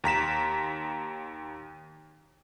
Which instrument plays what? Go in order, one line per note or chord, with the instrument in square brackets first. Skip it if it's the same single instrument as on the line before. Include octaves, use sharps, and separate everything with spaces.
[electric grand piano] D#2 A#5 B6 E7